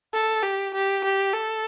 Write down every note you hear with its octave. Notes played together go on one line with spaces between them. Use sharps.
A4
G4
G4
G4
A4